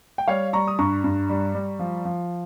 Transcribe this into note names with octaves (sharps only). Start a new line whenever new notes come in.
G5
G3 C#5 F5
G3 A#5 C#6
D#6
G2 A#5 C#6
G2
G3
G3
F3
F3